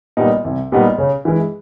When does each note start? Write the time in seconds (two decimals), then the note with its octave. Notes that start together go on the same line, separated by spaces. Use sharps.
0.17 A#2 G3 B3 D#4
0.45 C2
0.72 A#2 G3 B3 D#4
0.98 C#3
1.25 E3 G#3